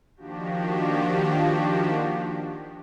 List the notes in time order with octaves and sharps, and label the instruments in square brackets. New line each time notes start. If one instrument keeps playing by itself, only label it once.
[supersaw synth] D#3 F3 A#3 D4 F#4 G4